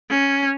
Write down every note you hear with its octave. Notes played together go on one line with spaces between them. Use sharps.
C#4